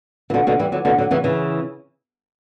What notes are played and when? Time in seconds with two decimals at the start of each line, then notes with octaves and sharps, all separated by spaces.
0.30 E3
0.34 B2 D3
0.47 B2 D3
0.59 E3 G3
0.72 D3 F#3
0.85 B2 D3
0.98 D3 F#3
1.11 C#3 E3
1.24 C#3 E3